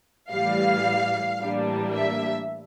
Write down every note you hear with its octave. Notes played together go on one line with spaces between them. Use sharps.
A2 E3 G3 F5
A2 E3 G3 A#3 D4
E5